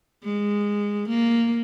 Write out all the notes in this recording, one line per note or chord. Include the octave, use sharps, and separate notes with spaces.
G#3
A#3